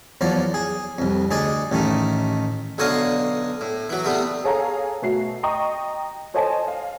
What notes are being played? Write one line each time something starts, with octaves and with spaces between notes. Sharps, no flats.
E2 F3 F#3 D5
G#4
C2 F2
D2 G#4 D5 D#5
A1 D#3 A3 D#4
B1 D3 C#5 D#5 F5 C#6
A2
E3 F#3
C3 G3 A3 B3
G#4 A4 C#5 F5 G#5 A#5
B2 A3 F#4 C7
D#5 G5 A#5 C#6 D#6
A4 C5 C#5 D#5 G#5 A5
F5